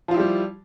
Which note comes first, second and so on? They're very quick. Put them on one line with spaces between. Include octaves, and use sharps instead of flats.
F3 F4 E4 G4 G3